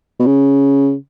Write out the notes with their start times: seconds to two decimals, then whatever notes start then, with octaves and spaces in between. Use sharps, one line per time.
0.19 B2
0.26 C#3